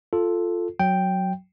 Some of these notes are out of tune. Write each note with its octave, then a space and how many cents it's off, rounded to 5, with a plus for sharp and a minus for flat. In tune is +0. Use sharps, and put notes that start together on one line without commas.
F4 +0 A4 +0
F#3 +0 G5 +0